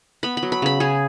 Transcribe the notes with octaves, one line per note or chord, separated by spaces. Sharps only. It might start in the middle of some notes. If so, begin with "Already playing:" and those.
B3 B5
B5
F#3
B5
C#3 B5
C#3 G#4